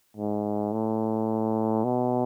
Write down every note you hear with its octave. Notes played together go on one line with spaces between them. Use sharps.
G#2
A2
B2